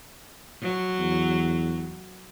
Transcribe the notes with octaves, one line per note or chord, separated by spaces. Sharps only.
F#3
E2